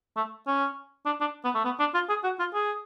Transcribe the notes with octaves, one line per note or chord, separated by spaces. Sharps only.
A3
C#4
D4
D4
B3
A3
B3
D4
F4
G#4
F#4
F4
G#4